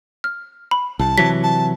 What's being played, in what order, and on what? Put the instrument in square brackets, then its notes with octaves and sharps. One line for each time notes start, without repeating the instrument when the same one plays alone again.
[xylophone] F6
B5
[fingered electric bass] C2 [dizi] A5
[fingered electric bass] C3 E3 F#3 [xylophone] B6
[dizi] A5